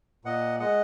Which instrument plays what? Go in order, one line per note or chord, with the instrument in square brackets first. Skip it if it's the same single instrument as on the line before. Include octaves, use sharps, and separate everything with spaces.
[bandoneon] A#2 D#5 F#5
G#3 D#5 F#5